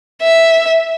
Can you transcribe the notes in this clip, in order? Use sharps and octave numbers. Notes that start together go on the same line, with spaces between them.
E5